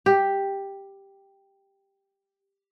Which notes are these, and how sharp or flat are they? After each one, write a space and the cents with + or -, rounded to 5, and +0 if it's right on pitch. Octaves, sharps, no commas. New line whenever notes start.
G4 +5